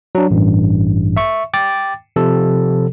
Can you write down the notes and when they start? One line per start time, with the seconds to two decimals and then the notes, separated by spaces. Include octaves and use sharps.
0.15 F#3 D4
0.31 A1 G2
1.17 E5 C#6
1.54 G5 D6 A6
2.16 C3 F3 A4